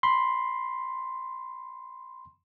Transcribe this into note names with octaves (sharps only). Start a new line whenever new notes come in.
B5 C6